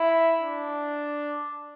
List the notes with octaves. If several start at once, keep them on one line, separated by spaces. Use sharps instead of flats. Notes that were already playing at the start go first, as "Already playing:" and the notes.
Already playing: E4
D4